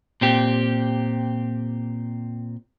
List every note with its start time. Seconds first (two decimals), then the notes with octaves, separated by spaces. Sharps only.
0.21 A#2 C4 G4